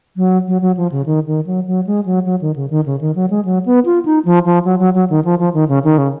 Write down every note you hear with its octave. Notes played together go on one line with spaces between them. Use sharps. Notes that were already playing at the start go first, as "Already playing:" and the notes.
F#3
F#3
F#3
F3
C#3
D#3
D#3
F#3
F#3
G#3
F#3
F#3
D#3
C#3
D#3
C#3
D#3
F#3
G#3
F#3
B3
F4
D#4
F3
F3
F#3
F#3
F#3
D#3
F3
F3
D#3
C#3
D#3
C#3